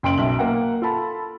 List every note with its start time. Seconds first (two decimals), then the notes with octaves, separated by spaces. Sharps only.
0.03 F#1 G5 C6 D7 F#7
0.18 B1 E5 F#7
0.38 A#3 F#5 G5
0.82 F4 A4 A5 B5